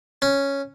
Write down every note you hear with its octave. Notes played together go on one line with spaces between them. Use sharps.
C#4